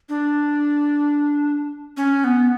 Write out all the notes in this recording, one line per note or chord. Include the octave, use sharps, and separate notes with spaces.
D4
C#4
B3